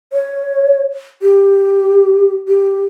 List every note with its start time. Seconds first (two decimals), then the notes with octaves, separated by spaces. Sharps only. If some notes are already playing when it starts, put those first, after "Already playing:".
0.13 C#5
1.22 G4
2.48 G4